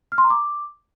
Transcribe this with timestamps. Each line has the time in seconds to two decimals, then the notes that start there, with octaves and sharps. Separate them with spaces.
0.12 F6
0.18 C6
0.24 A#5
0.30 D6